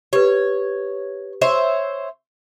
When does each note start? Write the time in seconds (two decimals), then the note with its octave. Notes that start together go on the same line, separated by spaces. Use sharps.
0.13 G4 B4 C#5
1.42 C5 C#5 E5